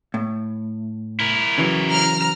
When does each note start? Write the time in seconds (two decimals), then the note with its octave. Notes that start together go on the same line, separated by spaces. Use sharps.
0.14 A2
1.20 E4 A#4
1.58 C#3 E3 F#3
1.91 A#5 F6